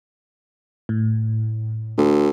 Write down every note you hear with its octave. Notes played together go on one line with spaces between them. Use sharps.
A2
D2